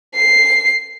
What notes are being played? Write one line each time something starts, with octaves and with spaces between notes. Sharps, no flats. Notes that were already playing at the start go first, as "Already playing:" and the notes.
C7